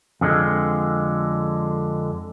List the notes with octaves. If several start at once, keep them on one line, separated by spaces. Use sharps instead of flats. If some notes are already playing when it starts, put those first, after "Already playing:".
F2 D3 G#3